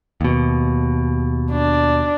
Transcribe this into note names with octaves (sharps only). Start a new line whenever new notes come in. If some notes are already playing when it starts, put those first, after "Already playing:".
D#2 B2
D4